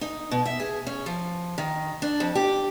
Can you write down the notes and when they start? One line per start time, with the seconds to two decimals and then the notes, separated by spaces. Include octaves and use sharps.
0.01 D#4
0.31 B2
0.45 E5
0.60 G#4
0.87 C#4
1.06 F3
1.58 D#3
2.02 D4
2.20 F2
2.35 G4